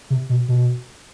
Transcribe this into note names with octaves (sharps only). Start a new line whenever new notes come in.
C3
B2
B2